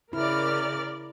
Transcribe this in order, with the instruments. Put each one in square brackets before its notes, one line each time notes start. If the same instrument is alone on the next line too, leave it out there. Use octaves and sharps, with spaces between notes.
[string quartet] C#3 F6 [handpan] E4 [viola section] A#4 D5